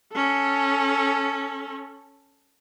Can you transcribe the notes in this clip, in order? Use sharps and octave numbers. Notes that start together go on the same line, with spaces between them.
C#4 A4